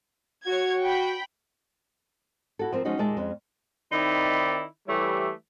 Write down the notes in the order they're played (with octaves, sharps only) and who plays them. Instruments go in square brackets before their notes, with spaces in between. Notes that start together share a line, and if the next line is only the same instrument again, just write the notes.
[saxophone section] F#4 [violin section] C#5 G#6
[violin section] G5 B5
[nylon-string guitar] E4 F#4 A4
F3 C4 A#4
F3 G#3 C#4 D#4 F#4 C5
D#2 A#2 G#3 E5 A5
F2 G#3 C#4
[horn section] D#3 C4 D#4 E4 D5 B5
E3 G3 A3 E4 G4 C#5